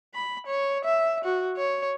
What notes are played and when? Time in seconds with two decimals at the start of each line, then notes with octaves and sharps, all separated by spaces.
0.15 B5
0.46 C#5
0.85 E5
1.24 F#4
1.57 C#5